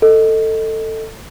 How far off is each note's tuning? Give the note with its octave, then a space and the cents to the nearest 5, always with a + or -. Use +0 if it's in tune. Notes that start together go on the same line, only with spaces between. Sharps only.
A4 +15 D#5 +0